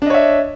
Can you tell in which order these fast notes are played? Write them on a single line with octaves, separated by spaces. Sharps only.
D4 D#5 C#5 E5